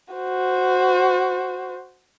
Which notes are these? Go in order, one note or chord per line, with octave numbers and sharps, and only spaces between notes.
F#4 C5